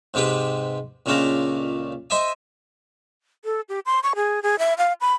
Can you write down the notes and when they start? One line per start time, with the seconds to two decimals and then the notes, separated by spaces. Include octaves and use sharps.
0.14 G#2 C3 G4 B4
1.06 C#2 A#2 A3 D4 F5 A#5
2.10 C5 D#5 E5 G#5
3.45 A4
3.69 G4
3.86 C6
4.03 C#6
4.16 G#4
4.42 G#4
4.59 E5
4.78 F5
5.01 B5